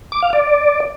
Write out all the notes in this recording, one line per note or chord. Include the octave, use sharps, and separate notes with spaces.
D6
F5
D5